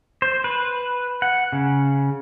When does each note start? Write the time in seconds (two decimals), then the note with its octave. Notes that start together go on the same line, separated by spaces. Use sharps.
0.22 C5
0.44 B4
1.22 F#5
1.52 C#3